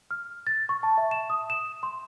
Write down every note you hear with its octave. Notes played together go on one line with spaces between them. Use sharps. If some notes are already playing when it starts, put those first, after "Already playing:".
F6
A6
C#6
A5
E5
E7
D#6
E7
C6